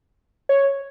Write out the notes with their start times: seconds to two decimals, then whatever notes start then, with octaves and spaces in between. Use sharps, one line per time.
0.49 C#5